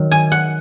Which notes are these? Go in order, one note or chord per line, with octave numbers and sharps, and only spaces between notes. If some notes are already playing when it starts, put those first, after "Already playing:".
Already playing: D#3 F#3
G#5
F#5